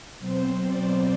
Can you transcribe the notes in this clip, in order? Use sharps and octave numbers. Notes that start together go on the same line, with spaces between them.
B2 F#3 C4 C5
D5